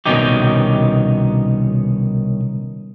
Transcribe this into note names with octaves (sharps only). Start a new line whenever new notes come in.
C2 B2 D#3 C#4 D#4 G4